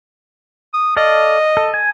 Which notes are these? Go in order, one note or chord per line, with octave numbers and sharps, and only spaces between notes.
D#6
A4 D5 D#5 F5
A4
G#5